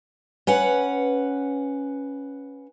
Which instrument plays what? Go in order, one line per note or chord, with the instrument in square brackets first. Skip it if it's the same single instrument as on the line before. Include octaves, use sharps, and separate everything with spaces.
[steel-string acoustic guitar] C#4 B4 F#5